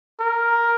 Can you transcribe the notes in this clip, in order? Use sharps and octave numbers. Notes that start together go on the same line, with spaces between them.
A#4